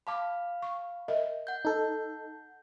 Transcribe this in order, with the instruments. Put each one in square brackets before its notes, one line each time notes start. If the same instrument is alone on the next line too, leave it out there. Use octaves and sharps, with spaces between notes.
[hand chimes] F5 B5 [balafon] A5 D6
[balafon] C#6
A#4 D#5 E5
[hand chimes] F#5 G6
[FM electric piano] D#4 A4